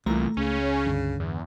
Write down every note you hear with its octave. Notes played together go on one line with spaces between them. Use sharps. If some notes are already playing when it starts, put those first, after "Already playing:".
C2 A#2 E3 F3 A3 A#5
C#2 C#3 C#4
G2 D3
E2